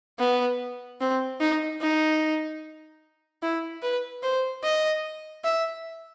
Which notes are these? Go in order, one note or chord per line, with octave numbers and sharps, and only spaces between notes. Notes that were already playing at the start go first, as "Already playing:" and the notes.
B3
C4
D#4
D#4
E4
B4
C5
D#5
E5